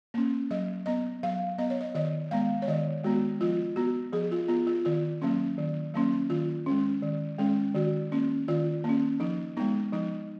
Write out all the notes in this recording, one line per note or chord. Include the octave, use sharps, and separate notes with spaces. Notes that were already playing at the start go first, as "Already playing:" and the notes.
A#3 C#4
F#3 D#5
B3 D#5
F#3 F5
B3 D#5
C#5
D#5
D#3 D#5
G#3 B3 F5
C#5
D#3 D#5
G#3 B3 F#4
F3 F4
B3 F#4
F3 G#4
F4
B3 F4
F4
D#3 F4
F#3 A#3 C#4
D#3
F#3 A#3 C#4
D#3 F4
G#3 C#4
D#3
G#3 C#4
D#3 F#4
A#3 C#4
D#3 F4
A#3
C#4
F3 D#4
G#3 B3 D#4
F3 D#4